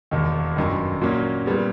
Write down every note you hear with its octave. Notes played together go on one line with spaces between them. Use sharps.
E1 D#2 D#3
G1 F#2 D#3
A#2 F#3 A#3 C#4
A#2 G3 B3